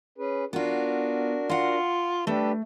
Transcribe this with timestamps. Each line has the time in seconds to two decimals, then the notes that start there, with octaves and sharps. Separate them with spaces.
0.18 C#4 G#4 B4
0.53 B3 D4 F4 F#4 A#4
1.50 F4 F5 F#5
2.27 A3 D4 G4 A4 B4